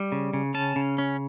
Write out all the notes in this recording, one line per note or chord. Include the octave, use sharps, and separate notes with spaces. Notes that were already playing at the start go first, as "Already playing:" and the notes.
Already playing: G3
C#3
C#3
C#4 A5
C#3
C#4